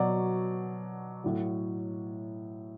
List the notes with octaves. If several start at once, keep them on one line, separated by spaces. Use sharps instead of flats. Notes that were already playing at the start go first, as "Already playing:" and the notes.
Already playing: B2 F#3 D5
A2 F#3